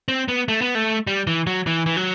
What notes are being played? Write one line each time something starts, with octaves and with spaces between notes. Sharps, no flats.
C4
B3
A3
B3
A3
G3
E3
F#3
E3
E3
F#3